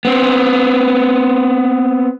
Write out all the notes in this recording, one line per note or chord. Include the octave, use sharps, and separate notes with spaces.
B3 C4